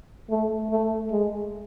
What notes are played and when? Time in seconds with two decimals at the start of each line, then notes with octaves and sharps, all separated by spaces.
0.30 A3
0.70 A3
1.11 G#3